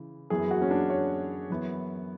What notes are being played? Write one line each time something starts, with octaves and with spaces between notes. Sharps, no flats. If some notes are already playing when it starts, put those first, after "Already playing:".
Already playing: C#3 E3
F#2 E3 B3 G#4
F#4
C#4
D4
C#5
F#2 E3 B3